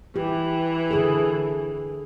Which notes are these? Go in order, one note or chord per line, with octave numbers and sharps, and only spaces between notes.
E3 G4
D3 G#4 A4